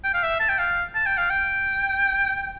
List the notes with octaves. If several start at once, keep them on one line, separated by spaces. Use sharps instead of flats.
G5
F5
E5
A5
G5
F5
A5
G5
F5
G5